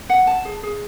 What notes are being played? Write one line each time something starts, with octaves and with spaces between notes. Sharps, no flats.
F#5
A5
G#4
G#4